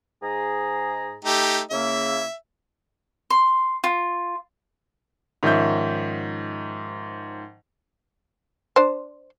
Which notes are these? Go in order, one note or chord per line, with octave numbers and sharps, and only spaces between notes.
G#2 G#4 A#5
A3 D#4 G4
C#3 A#3 E4 E5
C6
F4
G#2 D#3 F3 C#4 E5 G6
D4 C5